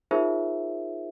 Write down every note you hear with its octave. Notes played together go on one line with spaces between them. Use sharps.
D#4 F4 G#4 A#4 C5 E5